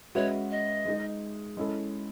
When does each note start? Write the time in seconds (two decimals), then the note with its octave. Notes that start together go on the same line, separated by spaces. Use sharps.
0.15 G#3 C#4 F#4 B4 C#5 E5
0.50 D#5
0.85 G#3 D#4 G#4
1.57 G#3 C#4 E4 A4